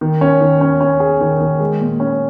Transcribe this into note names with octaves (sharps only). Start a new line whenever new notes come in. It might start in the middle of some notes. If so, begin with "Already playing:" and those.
D#3
C#4
D#3
C#4
C#4
G#4
D#3
D#3
G#3
A#2
C#4